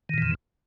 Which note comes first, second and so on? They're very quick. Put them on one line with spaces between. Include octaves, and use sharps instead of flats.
D#3 A#2 E3 F2